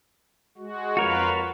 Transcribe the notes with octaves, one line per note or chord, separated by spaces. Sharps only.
G#3 F#4
F2 F4 F#4 A#4 B4 C#5